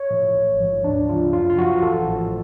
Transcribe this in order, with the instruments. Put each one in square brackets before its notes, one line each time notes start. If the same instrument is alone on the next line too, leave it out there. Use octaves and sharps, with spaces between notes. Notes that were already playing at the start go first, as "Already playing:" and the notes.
Already playing: [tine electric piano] C#5
A2 F3
A1
G#2 F3
D2 D4
C#3 F3 F4
F#2 F4
F4
F3 F#4
A1 A4
A2 F3